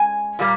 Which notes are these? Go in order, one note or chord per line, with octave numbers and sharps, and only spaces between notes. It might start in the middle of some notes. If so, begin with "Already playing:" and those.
Already playing: G#3 C#4 G#5
A#2 G3 A#3